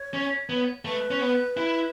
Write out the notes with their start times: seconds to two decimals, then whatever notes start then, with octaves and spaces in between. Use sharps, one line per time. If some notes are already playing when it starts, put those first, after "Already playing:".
Already playing: C#5
0.14 C#4
0.49 B3
0.85 A3 B4
1.11 C#4
1.21 B3
1.57 E4